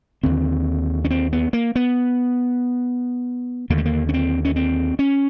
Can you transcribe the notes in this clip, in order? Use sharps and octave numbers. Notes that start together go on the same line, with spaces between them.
D#2 D3 C4
C#4
C4
B3
A#3
B3
D#2 D3 A#3
A3
A#3
C#4
C4
C#4
C4
C#4